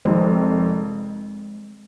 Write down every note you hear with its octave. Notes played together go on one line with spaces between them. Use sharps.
F1 F2 D#3 G#3 C4